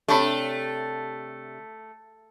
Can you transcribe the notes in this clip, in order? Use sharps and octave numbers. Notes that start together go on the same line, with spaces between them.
C3 A3 D4 G4 C#5 D5 A5 B5